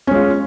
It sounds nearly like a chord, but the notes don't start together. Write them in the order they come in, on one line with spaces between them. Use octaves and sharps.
C#4 G#3 F4